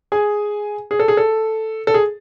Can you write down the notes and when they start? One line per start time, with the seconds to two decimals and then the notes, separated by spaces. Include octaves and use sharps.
0.12 G#4 G#5
0.91 G#4
0.99 A4
1.08 G#4
1.17 A4
1.87 A4
1.94 G#4